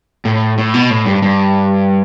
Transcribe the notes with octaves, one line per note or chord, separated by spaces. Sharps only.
A2
A2
B2
A2
G2
G2